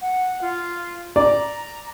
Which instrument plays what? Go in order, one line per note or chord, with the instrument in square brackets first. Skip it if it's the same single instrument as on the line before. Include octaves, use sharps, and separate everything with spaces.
[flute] F#5
F4
[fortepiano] D5 [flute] A#5